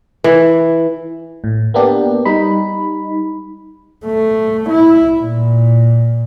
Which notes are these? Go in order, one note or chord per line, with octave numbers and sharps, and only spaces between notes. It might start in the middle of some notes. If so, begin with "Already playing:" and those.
E3
A2
A#3 B3 D4 G4
G3 D#4 B5
A3
E4
A#2